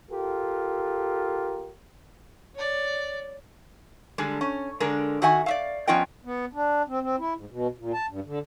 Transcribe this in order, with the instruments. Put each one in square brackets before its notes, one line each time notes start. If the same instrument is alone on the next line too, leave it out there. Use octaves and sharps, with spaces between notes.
[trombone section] F4 G4 A4 A#4
[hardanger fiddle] C#5 D5
[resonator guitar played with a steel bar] D3 G3 G#3
C#4
D3 G#3 A#4
D#3 F#4 E5 F#5 G#5
D5 E5 F5
F3 B3 C#4 F4 D#5 G5
[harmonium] B3
D4
C4
C4
E4
G#2
B2
A#2
A5
G2
D3